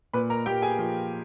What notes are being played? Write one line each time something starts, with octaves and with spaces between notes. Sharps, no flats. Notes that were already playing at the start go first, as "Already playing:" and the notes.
A#2 B4 B5
A#4 A#5
A#3 G4 G5
G#4 G#5
F3